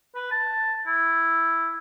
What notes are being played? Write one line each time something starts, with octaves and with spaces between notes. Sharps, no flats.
B4
A5
E4